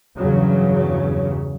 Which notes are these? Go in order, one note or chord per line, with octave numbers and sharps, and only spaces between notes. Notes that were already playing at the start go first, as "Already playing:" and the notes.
E2 G2 C#3 F#3